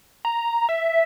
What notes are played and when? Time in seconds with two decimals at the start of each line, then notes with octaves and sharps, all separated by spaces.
0.25 A#5
0.69 E5